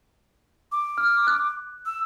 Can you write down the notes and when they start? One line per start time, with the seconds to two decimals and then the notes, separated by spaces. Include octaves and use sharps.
0.72 D6
0.98 F6
1.27 F#6
1.86 E6